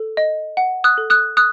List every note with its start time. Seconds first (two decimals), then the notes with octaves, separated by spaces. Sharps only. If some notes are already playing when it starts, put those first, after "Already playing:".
Already playing: A4
0.17 D#5
0.57 F#5
0.84 D#6 F#6
0.98 A4
1.10 D#6 F#6
1.37 D#6 F#6